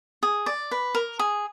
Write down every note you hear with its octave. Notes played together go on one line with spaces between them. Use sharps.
G#4
D5
B4
A#4
G#4